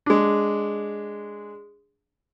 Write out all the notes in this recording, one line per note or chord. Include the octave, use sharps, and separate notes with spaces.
G#3 D4